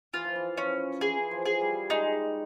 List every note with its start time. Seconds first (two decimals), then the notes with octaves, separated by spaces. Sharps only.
0.14 E3 F4
0.25 F3
0.36 E3
0.57 F3 C#4
1.01 E3 G#4
1.31 F3
1.45 G#4
1.61 G3
1.90 G#3 D#4